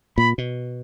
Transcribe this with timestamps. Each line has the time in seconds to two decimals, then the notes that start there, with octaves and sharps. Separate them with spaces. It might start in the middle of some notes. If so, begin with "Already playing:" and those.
0.18 A#2 B5
0.38 B2